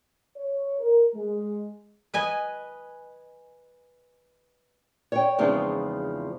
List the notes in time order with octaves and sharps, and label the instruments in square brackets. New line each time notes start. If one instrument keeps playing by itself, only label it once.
[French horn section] C#5
A#4
G#3
[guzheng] B4 D#5 G#5
[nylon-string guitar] C#5 G5
E2 C#3 F3 G#3 C4 D#4